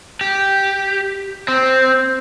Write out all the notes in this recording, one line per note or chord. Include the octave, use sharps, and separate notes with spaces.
G4
C4